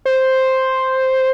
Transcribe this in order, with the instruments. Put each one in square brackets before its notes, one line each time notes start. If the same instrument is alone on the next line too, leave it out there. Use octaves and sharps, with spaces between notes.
[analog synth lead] C5